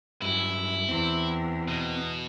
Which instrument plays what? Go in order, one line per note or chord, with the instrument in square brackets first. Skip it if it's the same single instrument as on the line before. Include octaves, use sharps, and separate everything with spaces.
[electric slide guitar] G2 F#3 [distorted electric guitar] E4
[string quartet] E2 [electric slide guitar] C4
[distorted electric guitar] B2